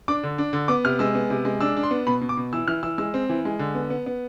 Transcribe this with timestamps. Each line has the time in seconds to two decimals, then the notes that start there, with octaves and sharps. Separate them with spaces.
0.08 D4 D6
0.23 D3
0.38 D4
0.53 D3
0.68 B3 D6
0.84 C3 F6
0.99 G#3 E6
1.15 B3
1.30 C3
1.45 G#3
1.61 D4 E6
1.76 D4
1.83 C6
1.91 B3
2.07 B2 B5
2.21 B2
2.29 D6
2.37 B2
2.53 E3 E6
2.68 E3 F6
2.83 E3 E6
2.98 G#3 E6
3.14 C4
3.29 E3
3.45 G#3
3.59 D3
3.75 B3
3.90 B3
4.06 B3